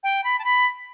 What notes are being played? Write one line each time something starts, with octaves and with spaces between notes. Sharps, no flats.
G5
B5
A5
B5